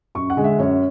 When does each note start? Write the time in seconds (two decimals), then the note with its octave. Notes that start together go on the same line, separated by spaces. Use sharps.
0.15 F#2 C#6
0.30 F#5
0.37 D3 G#3
0.44 E5
0.59 F#2 C#5